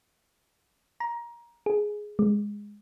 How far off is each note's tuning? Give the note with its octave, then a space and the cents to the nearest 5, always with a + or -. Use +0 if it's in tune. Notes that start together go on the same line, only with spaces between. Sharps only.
A#5 +20
G#4 +5
G#3 -10